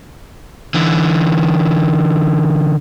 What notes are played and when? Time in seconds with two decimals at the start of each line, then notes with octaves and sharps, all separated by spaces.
0.74 D3 E3